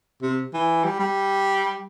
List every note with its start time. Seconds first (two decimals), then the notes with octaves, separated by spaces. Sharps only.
0.22 C3
0.54 E3
0.84 G3
0.99 G3